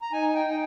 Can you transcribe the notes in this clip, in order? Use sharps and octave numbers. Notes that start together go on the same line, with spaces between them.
A#5
D#4 G#5
G#5
G5
D#4
G5